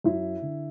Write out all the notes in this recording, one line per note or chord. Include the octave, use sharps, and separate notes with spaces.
F#2 E4
D3